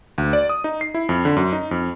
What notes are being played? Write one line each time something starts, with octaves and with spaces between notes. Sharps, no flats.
D2
D5
D#6
D#4
C7
E4
F2
D3
F#2
D#4
F2